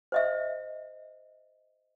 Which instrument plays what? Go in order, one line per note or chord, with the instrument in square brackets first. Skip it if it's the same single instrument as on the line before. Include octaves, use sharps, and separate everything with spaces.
[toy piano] C5 D#5 E5